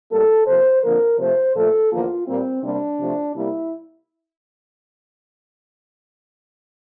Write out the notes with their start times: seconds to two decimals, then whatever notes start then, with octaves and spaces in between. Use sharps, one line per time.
0.11 A2 G3 A#3 A4
0.46 C3 F3 A#3 C5
0.83 F2 D3 F3 A#3 A#4
1.19 C3 F3 A3 C5
1.55 A#2 F3 A3 A4
1.91 E2 D3 F3 A#3 F4
2.27 A#2 G3 A#3 C4
2.63 C3 G3 A#3 D4
3.00 C3 F3 A3
3.36 C3 G3 A#3 E4